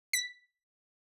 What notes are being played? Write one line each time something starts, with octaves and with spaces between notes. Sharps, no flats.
B6